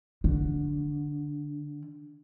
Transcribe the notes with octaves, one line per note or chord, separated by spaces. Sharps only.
D3